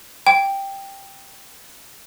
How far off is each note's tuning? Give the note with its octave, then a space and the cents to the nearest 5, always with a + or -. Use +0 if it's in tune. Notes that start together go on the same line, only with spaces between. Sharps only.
G5 +5